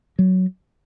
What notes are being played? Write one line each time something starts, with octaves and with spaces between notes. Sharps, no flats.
F#3